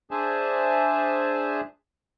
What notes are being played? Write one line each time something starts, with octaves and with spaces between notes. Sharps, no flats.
D4 G#4 C5 E5 G#5 A5